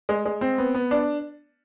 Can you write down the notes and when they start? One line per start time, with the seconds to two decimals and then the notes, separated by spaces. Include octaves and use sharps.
0.09 G#3
0.25 G#3
0.41 C4
0.58 B3
0.75 B3
0.91 D4